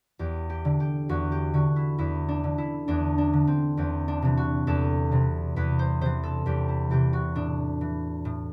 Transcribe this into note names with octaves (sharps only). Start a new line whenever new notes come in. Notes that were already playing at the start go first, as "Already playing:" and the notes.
E2 G4
G4
D3
G4
E2 F#4
G4
D3 F#4
E4
E2 E4
D4
D3
E4
E2 D4
D4
D3
C4
E2 C4
D4
C3 E3
F#4
E2 A4
C3 E3
E2 B4
C5
C3 E3 C5
A4
E2 G4
E4
C3 E3 G4
F#4
A2 D4
E3
A2